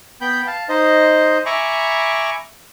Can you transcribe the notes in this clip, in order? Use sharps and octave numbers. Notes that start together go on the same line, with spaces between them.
B3 G5 B5 G6
F5 A5
D#4 C5 D#5
E5 G#5 A#5 B5 C#6 D6